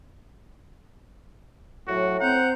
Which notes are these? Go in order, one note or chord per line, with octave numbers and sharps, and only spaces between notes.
A2 F#3 F#4
C4 C5 F#5 A#5 G6